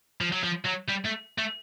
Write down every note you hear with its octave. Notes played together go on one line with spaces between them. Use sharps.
F3
F#3
F3
F#3
G3
A3
A3